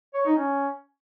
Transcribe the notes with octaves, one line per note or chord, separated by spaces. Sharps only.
C#5
D#4
C#4